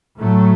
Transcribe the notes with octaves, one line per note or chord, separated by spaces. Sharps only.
A2 F#3 A3